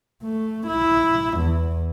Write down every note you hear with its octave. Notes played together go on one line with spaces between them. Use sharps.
A3
E4
E2